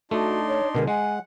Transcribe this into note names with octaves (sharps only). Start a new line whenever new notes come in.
A3 D4 D#4 F#4 C6
C#5
B2 D3 G#3 A#4
G#3 F#5 G#5